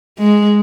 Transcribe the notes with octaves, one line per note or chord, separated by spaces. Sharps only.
G#3